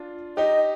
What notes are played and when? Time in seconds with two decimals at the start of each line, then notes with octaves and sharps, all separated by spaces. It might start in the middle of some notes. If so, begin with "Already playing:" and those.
Already playing: D4 F4
0.37 D#4 G4 D#5